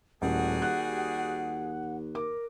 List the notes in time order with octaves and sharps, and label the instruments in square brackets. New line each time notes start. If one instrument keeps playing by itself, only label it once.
[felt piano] D#1 [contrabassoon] A2 [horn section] G3 F#4 G#4 [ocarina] F#5
[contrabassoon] D#2 [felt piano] F#6
[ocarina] A#4 [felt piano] D6